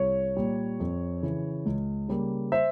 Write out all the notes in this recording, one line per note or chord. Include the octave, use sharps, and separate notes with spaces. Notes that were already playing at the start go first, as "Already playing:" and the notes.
Already playing: C2 C#5
A#2 G3
F2
C#3 E3
C#2
C#3 G3 A#3
C5 E5